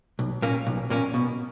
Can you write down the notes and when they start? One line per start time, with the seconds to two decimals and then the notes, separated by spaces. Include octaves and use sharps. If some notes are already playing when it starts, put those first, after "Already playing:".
0.19 B1
0.42 A#2 A#3 C#4
0.67 B1
0.90 A#2 A#3 C#4
1.14 B2